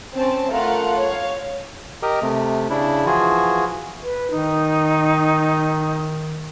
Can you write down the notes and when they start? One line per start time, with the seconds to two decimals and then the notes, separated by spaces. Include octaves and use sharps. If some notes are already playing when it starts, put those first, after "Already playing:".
0.14 C4 C#4 A5
0.52 A3 F4 A#4 F5 F#5
0.97 C#5 F5
2.03 G4 A#4 D#5
2.22 C3 A3
2.70 C#3 D4 E4
3.06 E3 F3 F4 F#4 G#4
4.03 B4
4.31 D#3 D#4